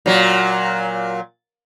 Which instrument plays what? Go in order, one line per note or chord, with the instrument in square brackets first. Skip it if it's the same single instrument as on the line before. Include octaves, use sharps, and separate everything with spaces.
[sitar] A#2 F#3